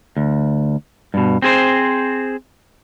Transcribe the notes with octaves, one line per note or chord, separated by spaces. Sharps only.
D2
G2 B2
C4 G#4 C5